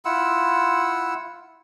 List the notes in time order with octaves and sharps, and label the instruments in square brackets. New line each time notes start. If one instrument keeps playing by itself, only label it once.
[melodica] E4 F4 F#5 E6